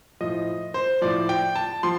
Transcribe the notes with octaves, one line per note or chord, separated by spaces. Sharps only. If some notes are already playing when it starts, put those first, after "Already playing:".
A2 F3 D#5
C5
A2 F3 D5
G5
A5
F3 C6